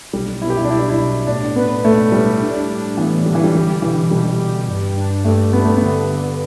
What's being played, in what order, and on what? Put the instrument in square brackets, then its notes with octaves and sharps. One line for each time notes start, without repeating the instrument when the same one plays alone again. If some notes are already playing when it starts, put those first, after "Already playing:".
[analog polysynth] B1 [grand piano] G3
[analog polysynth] B2 [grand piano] E4
[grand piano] G4
E4
D4
[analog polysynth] B2 [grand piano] E4
[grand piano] E4
[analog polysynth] B2
[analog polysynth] A2 [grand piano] D4
[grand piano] B3 [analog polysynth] B4
[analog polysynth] A2 [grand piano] A3
[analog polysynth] A2 [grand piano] G3
[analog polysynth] D4
D4
[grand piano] E3 [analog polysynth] B3
[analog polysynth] D3 [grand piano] G3
[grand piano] E3
G3
[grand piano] G3 [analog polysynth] G4
[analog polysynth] B2 [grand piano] E3
[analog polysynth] B2 [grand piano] G3
[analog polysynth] G4
G2
D4
[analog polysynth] G2 [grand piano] A3
[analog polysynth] G3 [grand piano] B3
[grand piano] A3
[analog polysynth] D3 [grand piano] B3
[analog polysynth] D3